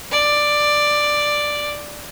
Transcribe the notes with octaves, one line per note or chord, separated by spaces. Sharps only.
D5